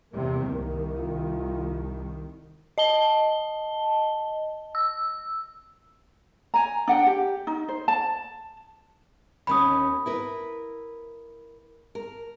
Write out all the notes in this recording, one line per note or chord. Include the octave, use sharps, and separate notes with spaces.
E2 C3 G3 A#3
C2 D#3 A#4
F4
D#5 A5 G7
E6
G#5 A#5
D4 F#5 G5
G4
D#4
C5
A5
D#2 C#4 B5 D#6
E4 A#4 B4
A#4